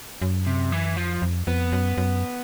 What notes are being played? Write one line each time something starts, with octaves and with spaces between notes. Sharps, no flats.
F#2
C3
E3
F2 F3
F2
F2 B3
F#2
F#2